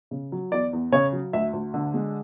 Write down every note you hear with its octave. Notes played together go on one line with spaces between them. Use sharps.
C#3
F#3
E2 D5
E2
C#3 C#5
F#3
D2 E5
D2
D3
G#3